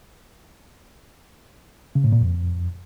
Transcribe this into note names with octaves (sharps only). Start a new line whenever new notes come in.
C#3
A2
A#2
F2